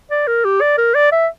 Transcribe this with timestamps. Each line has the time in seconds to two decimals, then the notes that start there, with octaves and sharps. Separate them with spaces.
0.11 D5
0.27 A#4
0.45 G4
0.61 D5
0.78 A#4
0.94 D5
1.12 E5